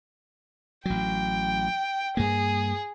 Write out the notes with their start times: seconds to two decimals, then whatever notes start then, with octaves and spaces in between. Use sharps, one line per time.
0.85 A1 F#3 G5
2.17 G2 A#3 G#4